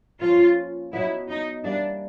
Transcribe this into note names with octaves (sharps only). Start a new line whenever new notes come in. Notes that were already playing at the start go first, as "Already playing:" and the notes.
F3 A#3 C#4 F4
B2 F#3 B3 E4
D#4
E3 G3 A#3 D4